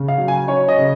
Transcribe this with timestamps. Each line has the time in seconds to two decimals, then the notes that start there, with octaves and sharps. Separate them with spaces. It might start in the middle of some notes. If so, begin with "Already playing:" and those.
Already playing: C#3
0.08 F5
0.18 F#3
0.28 G#5
0.48 C#4 C#5
0.68 D#5
0.78 C#3